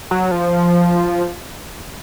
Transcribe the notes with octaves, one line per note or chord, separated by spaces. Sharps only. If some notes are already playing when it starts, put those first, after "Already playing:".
F#3
F3